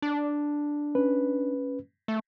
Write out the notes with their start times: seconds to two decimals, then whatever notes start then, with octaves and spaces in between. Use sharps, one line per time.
0.02 D4
0.95 C#4 B4
2.08 A3